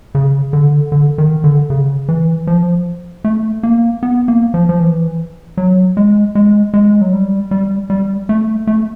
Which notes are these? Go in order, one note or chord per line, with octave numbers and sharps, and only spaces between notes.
C#3
D3
D3
D#3
D3
C#3
E3
F3
A3
A#3
B3
A#3
F3
F3
E3
F#3
G#3
G#3
G#3
F#3
G3
G3
G3
A3
A3